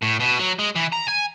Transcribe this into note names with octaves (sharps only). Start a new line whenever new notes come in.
A2
B2
F#3
G#3
E3
A#5
G#5